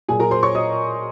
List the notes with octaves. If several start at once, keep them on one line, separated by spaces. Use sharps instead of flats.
A#2 F#3 G#4 G#5
A#4 A#5
C5 C6
C#5 C#6
D#5 D#6